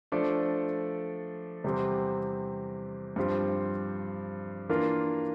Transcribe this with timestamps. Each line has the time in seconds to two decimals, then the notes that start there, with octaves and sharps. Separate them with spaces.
0.12 F3 A3 D4 A4 D5
1.64 E2 C3 G3 C4 G4
3.16 G2 F3 C4 G4
4.69 E3 A#3 D4 F4 A#4